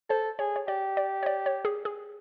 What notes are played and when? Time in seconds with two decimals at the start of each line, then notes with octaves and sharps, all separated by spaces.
0.09 A4 C5
0.39 G#4 C#5
0.56 C#5
0.67 G4 D5
0.97 D5
1.23 C#5
1.26 D5
1.46 C#5
1.65 G#4
1.85 G#4